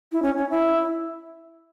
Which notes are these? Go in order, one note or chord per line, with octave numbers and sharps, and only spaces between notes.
E4
C#4
C#4
E4